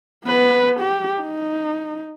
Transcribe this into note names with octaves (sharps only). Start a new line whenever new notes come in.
B3 B4
G4
D#4